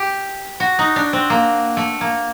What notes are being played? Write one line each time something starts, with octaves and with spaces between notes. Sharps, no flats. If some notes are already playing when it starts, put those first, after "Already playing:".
Already playing: G4
F#4
D#4
D4
C4
A#3
A3
A#3